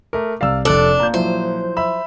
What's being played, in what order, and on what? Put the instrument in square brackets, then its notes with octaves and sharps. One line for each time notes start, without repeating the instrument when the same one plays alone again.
[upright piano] A3 A#4 [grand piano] D6
[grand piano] C2 D5 [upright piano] F5 E6
[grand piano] F1 F#6 F#7 [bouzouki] D4 [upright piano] A4
[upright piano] A#2 [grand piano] A#5 G6
[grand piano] F3 F#3 E4 [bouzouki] C5
[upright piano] E5 B5 E6